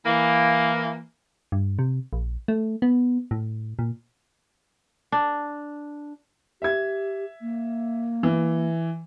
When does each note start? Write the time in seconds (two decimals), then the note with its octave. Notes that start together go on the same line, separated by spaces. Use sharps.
0.05 E3 A#3
1.52 G2
1.79 C3
2.13 A#1
2.48 A3
2.82 B3
3.31 A2
3.79 A#2
5.12 D4
6.62 G4 E5 G#6
7.41 A#3
8.23 E3